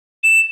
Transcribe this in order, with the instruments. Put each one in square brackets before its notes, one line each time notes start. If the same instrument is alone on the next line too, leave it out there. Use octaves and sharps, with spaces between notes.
[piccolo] E7